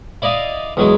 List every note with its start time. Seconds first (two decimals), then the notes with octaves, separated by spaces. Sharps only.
0.22 E4 D5 D#5 F5
0.77 E2 F#3 G#3